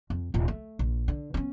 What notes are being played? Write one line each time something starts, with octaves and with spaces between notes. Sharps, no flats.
F2
D#1 A#2
A3
A#1
D3
B3 C#4